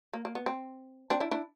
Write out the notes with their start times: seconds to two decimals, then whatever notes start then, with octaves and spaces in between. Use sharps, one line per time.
0.13 A#3
0.25 A#3
0.35 B3
0.46 C4
1.10 C4 D4
1.20 D4 E4
1.31 D4 E4